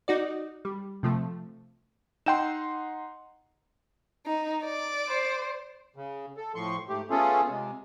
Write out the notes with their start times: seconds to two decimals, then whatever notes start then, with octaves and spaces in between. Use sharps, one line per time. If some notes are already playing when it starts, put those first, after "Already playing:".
0.08 D#4 F#4 D5
0.65 G3
1.03 C3 F3 A3
2.26 D#4 F#5 G5 C6 E6 E7
4.26 D#4
4.64 D5
5.09 C5
5.96 C#3
6.37 A4
6.55 A2 F3 C6 C#6
6.89 G#2 A3 G4
7.10 A3 B3 C#4 F4 G#4 A4
7.50 C3 G#3